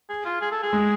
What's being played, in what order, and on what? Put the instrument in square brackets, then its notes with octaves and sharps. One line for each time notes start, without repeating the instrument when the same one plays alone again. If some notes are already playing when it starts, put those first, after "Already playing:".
[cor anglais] G#4
F4
G#4
A4
G#4
[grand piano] G#3